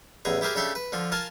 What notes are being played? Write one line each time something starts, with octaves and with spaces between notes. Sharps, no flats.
A1 E2 G#4 A#5
E4 G4 G#4 A#4 C5
C#3 D4 G4 A4 E5 C6
B4
D3 F3 F4
F4 A#4 G#5 A5